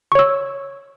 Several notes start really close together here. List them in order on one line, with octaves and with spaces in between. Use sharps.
C#6 C#5 E6